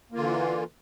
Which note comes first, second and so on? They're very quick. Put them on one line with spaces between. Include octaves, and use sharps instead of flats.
A#3 F4 D3 E3